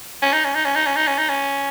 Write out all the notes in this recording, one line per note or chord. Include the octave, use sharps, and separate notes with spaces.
C#4
D#4
C#4
D#4
C#4
D#4
C#4
D#4
C#4
D#4
C#4